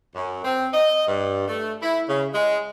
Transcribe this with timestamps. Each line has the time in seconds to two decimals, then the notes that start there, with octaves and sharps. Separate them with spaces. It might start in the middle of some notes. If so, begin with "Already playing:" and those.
0.16 F#2
0.44 C4
0.74 D#5
1.08 G2
1.47 A3
1.82 E4
2.08 C#3
2.34 G#3